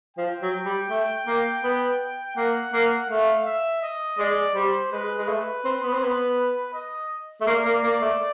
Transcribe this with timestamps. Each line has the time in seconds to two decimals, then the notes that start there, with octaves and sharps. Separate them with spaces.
0.17 F3 G5
0.42 F#3
0.65 G3
0.90 A3
1.27 A#3
1.64 B3
2.36 A#3 F#5
2.73 A#3
3.09 A3 F5
3.45 E5
3.82 D#5
4.18 G#3 D5
4.55 G3 C5
4.92 G#3 B4
5.18 G#3
5.28 A3 B4
5.65 C4
5.83 B3
5.93 C4
6.04 B3
6.74 D#5
7.41 A3
7.47 A#3 D5
7.65 A#3
7.84 A#3
8.01 A3